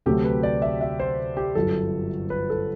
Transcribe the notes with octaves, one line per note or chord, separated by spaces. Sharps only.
D2 C3 F#3 A3 G4
B4
D5
E5
E5
C5
G4
G1 F#2 F#3 A4
B4
A4